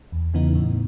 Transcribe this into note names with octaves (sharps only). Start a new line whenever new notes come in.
E2
C#3 E3 B3 D#4
A2